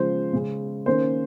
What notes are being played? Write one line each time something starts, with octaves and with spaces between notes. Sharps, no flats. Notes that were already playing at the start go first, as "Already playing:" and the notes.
Already playing: C#3 F3 G#3 C5
C#3 G#3 C#4
D#3 A#3 C#4 C5